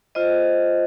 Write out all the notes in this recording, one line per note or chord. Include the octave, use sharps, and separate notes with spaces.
F4 C5 D#5